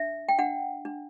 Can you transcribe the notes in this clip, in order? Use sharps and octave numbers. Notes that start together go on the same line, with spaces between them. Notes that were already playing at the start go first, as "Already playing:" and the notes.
Already playing: D4 E5
G5
D4 F#5
D4